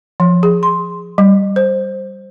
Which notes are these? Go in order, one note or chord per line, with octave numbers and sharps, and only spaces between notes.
F3
G#4
C6
G3
C5